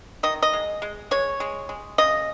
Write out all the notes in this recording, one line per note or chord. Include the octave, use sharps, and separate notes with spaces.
D#3 D#5
D#5
G#3
G#3
G#3 C#5
G#3
G#3
C#3 D#5